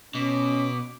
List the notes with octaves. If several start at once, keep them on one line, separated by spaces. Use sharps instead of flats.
B2 C#4 D6